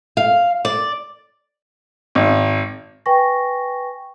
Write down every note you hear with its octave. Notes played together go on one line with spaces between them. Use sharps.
F5
D5
G#1
B4 G5 G#5 C#6 A#6